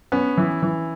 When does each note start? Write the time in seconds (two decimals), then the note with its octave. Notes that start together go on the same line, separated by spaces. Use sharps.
0.12 B3 C#4
0.37 E3
0.62 E3